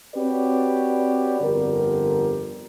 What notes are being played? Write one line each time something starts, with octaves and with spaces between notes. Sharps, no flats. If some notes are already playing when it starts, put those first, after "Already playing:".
C4 F#4 G4 B4 C#5 D5
G1 F2 D3 G4 A#4